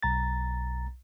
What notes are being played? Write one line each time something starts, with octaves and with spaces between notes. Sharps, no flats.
B1 A#5 A6